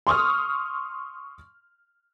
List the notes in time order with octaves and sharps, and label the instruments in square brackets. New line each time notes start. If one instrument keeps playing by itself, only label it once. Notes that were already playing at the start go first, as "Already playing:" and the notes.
[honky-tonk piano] C6 C#6 D#6 F6